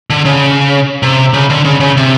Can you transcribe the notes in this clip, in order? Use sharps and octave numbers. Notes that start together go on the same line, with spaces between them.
D3
C#3
C3
C#3
D3
C#3
C#3
C3